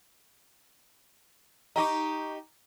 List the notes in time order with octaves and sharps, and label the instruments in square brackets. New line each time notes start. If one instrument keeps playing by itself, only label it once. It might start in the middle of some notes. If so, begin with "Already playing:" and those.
[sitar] D#4 G4 D#5 [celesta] A#5 C#6 D6